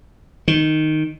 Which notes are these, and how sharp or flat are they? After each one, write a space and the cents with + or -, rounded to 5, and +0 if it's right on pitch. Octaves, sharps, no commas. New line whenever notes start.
D#3 -5